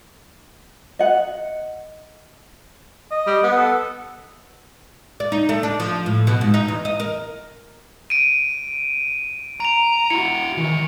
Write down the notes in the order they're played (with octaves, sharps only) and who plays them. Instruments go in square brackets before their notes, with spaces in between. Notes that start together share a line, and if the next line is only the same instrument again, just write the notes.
[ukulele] D#5 F#5
[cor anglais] D#5
[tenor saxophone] G3
B3
[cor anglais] A4
[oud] D5
D#4
A3
D4
F3
A2
B2
G#2
D#4
E2
D#5
A#4
[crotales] D7 D#7
[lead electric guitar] A#5 [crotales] D7 F7
[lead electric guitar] E4 F#4 [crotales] C#7
[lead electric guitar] D#3 E3